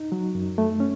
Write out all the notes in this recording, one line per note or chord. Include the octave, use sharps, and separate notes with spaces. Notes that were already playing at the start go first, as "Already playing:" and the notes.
Already playing: D#4
F#3
F#2
A3
C#4